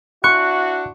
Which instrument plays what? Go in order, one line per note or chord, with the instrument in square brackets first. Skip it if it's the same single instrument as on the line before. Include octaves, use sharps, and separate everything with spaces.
[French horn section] D4 E4 F#4 [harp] C#6 [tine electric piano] F#6